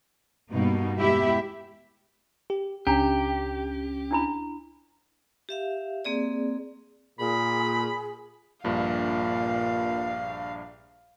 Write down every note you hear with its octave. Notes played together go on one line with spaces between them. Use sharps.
G2 B2 A#3 D#4
E2 G#3 E4 G4 E5
G4
C#2 C#4 D4 G4 A#5
D4 E4 B5
G4 E5 F5
A#3 C4 G#4 D5
A#2 G#4 B5
A#1 G2 A#2 F5